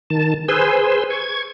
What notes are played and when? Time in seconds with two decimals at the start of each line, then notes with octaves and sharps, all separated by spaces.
0.10 D#3 A5
0.48 G#4 B4 C5 G#5 C6 E6
1.10 C#6 G#6